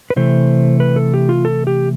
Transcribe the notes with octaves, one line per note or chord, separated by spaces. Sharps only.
B4
C3 E3 A3 C5
B4
A4
G4
F4
A4
G4